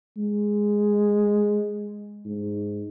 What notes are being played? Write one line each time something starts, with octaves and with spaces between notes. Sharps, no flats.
G#3
G#2